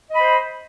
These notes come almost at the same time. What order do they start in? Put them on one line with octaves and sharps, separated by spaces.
D#5 B5 C5